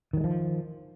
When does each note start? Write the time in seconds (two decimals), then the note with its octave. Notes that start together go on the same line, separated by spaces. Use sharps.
0.13 D#3
0.17 F#3
0.20 G#3
0.24 F3